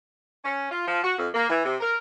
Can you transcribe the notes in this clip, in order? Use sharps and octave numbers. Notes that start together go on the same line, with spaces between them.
C#4
F4
F3
F#4
F2
A#3
E3
C3
A#4